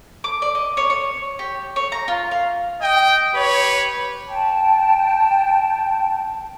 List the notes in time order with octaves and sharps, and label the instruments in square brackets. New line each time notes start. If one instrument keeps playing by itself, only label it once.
[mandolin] D6
D5
D#5
C#5
C#5
G4
C#5
A#5
F4
F5
[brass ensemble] D#5 G5
G4 B4 C#5
[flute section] G5 A5